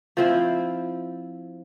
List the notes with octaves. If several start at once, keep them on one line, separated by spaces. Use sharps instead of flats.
F3 C4 E4